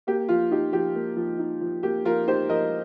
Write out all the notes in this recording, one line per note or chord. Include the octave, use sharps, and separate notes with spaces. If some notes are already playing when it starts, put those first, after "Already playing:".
A#3 G4
F3 F4
D#4 G4
F3 G4
A#3
F3
D#4
F3
A#3 G4
F3 F4 A#4
D#4 G4 C5
F3 A#4 D#5